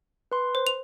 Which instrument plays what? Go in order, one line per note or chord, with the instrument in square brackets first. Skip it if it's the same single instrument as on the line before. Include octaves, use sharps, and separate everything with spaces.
[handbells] B4 C6
[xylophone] C5
F7